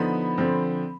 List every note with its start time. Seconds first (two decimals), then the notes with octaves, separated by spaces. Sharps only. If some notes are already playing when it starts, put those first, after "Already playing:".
Already playing: D3 F3 B3 D#4 B5
0.38 D3 F3 C4